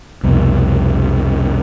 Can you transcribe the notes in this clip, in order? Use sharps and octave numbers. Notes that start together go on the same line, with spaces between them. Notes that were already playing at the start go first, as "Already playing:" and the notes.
C2 F2 B2